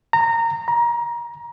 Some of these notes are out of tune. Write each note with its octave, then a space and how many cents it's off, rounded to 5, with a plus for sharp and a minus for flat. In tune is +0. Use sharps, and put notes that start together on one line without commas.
A#5 -20
A#5 +25